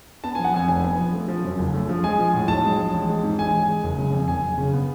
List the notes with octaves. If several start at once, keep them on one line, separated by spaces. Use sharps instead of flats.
B3 A5
F3 G#5
F#5
F2 G#5
F1 G#5
B3
F3
A3
F3
F#2
F#1
A3
F3
G#3 G#5
F3
A2
B1 A5
G#3
F3
A1
G#3
G#2
A1 G#5
A1
G#3
F#1
C#3
F2
F#1 G#5
F#1
C#3
B3